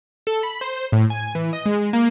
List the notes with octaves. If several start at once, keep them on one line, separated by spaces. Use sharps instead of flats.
A4
B5
C5
A2
G#5
E3
D#5
G#3
A#3